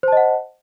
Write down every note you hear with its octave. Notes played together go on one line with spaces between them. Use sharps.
C5 D#5 F#5 A5